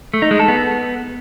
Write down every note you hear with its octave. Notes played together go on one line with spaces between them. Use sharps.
A3
D#4
G#3
A4
B3